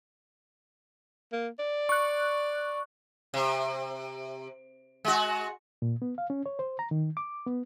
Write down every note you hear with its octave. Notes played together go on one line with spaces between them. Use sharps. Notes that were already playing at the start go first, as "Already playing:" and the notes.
A#3
D5
C#6 F#6
C3
G#3 F#4
A#2
B3
F5
C#4
C#5
C5
A#5
D#3
D6
B3